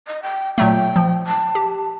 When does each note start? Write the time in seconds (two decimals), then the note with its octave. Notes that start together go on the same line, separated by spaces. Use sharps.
0.07 D#5
0.23 G5
0.58 A#2 F#3 A3 G5
0.96 F3
1.27 A5
1.55 G4